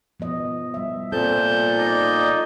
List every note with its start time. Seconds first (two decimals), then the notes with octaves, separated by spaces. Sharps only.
0.20 F3 B3 D#5
0.74 G3 E5
1.12 A#2 C4 A4 C5 A5 G6
1.78 D#4 D5 D#5